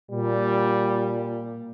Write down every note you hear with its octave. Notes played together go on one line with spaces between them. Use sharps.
A#2 G3